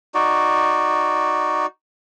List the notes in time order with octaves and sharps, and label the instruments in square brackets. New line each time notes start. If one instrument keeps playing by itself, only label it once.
[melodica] D#4 F#4 D5